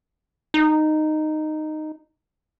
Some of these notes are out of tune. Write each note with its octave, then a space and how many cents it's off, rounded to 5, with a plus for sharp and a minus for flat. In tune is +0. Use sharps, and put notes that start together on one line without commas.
D#4 -10